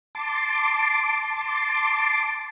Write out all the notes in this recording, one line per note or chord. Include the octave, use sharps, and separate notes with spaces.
A5 C6 D6